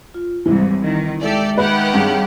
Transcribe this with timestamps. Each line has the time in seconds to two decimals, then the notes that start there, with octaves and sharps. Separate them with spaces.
0.14 F4
0.46 C2 G#2 E3 E4
0.81 D#3
1.21 G#3 G4 A4 D5 E5
1.58 D#3 G4 B4 F#5
1.94 G2 C4 G#4 C#5